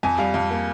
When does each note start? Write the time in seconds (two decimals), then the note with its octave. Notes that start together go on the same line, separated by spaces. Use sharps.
0.03 F2 G#5
0.18 G3 F5
0.34 F2 F5
0.50 A#3 F5